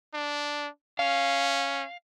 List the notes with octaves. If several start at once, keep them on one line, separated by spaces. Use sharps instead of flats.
D4
C#4 F5